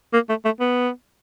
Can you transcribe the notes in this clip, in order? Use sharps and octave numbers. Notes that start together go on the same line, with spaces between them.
A#3
A3
A3
B3